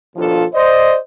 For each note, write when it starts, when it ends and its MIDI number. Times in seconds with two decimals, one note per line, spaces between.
0.16 0.44 39
0.16 0.44 47
0.16 0.44 53
0.16 0.44 62
0.16 0.44 65
0.16 0.44 69
0.54 0.96 72
0.54 0.96 74
0.54 0.96 75